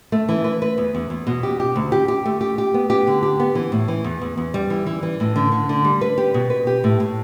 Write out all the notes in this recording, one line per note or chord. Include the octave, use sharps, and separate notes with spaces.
A3
E3
B4
B4
E2
E2
E2
B2
G4
G4
D2
G4
G4
A3
G4
G4
B3
G4
D3
G4
B3
E3
A2
E3
E2
E2
E2
G3
E3
E3
E3
A2
D3
D3
D3
G3
B4
G4
B2
B4
G4
A2
A2